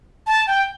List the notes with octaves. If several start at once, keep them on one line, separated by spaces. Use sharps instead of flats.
A5
G5